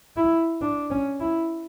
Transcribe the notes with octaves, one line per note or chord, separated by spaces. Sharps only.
E4
D4
C#4
E4